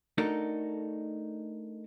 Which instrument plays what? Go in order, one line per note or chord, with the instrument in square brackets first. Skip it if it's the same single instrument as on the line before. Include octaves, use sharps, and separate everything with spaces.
[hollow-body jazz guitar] A3 D4 D#4 F#4 A4 A#4